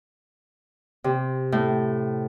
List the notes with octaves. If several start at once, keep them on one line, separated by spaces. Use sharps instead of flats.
C3
A2